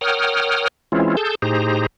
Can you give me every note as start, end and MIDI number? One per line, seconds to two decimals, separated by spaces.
0.01 0.68 70
0.01 0.68 73
0.01 0.68 78
0.01 0.68 79
0.01 0.68 87
0.01 0.68 89
0.92 1.17 52
0.92 1.17 56
0.92 1.17 60
0.92 1.17 61
0.92 1.17 64
0.92 1.17 65
1.17 1.35 68
1.17 1.35 69
1.17 1.35 81
1.17 1.35 91
1.42 1.86 45
1.42 1.86 63
1.42 1.86 67
1.42 1.86 68
1.42 1.86 72
1.42 1.86 82